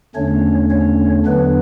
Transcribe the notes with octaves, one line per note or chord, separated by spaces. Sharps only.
E2 D3 A3 C#4 D4 C#5
C#4 C#5
E2 D3 F#3 B3 D4 B4